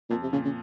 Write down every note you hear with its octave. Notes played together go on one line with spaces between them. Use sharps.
F2 A#2
C3
A#2 C#3
C#3